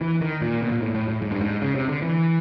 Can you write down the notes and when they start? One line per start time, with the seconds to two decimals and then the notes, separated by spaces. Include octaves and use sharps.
0.01 E3
0.21 D#3
0.42 A#2
0.62 B2
0.72 A#2
0.82 A2
0.95 A2
1.08 A2
1.22 G#2
1.32 G2
1.41 G#2
1.62 C#3
1.75 C3
1.88 D3
2.02 E3